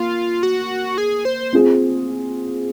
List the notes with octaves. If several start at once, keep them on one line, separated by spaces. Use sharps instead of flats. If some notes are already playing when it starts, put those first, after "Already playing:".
Already playing: A#3 F4
F#4
G#4
C5
C4 F4 G#4